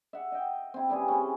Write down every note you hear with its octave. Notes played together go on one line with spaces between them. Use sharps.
E5 F#5
D#5 G5
C4 E4
C#3 G3 G#4 B4
C4 C#4